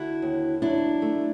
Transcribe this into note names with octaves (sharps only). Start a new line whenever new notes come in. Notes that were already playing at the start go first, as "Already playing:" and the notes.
Already playing: D3 E4 F#4
D#2
F#3 D4 E4
A3